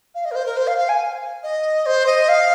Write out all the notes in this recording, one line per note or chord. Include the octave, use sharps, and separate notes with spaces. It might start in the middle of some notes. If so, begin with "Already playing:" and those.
F5
D#5
A#4
C5
A#4
C5
F5
F5
G#5
D#5
C5
D#5
F5